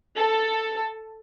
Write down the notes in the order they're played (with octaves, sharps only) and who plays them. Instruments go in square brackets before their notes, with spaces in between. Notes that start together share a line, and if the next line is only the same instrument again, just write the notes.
[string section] A4